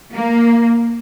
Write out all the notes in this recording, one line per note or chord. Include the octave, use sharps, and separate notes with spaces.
A#3